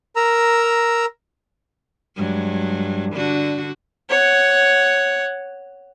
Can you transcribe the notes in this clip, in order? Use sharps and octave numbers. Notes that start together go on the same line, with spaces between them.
A#4 A#5 E6
G2 F#3 G#3
D3 D4 F#4
C#5 F#5